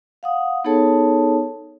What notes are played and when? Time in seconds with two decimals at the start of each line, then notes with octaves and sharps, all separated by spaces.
0.23 F5 F#5 D#6
0.64 B3 D#4 G#4 A4 C#5 A5